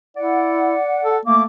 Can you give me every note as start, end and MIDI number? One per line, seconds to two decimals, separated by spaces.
0.17 0.76 64
0.17 1.18 74
0.17 1.18 78
1.02 1.19 69
1.25 1.45 57
1.25 1.42 58
1.25 1.42 86